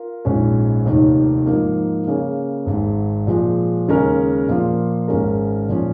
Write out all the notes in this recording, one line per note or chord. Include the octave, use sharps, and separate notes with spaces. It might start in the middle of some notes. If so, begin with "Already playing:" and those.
Already playing: F4 A#4
A#1 G#2 G#3 C#4
F1 D#2 D#3
G#2 F3 A#3 D#4
C#3 A#3 C#4 G#4 C#5
G#1 G#2 G#3
A#2 F3 G#3
D#2 C#3 G#3 C#4 A#4
A#2 F3 A#3 F4
G#1 G#2 G#3 C#4 A#4
A#2 F3 C#4